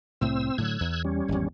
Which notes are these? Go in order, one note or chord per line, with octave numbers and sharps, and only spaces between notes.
C2 A2 C4 E6
A2 D3 F#3 E6 F#6 G#6
E2
G3 C#4
G#1 E2